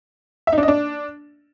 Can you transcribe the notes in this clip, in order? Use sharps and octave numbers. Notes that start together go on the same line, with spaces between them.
E5
D#4
D4
D#5
D4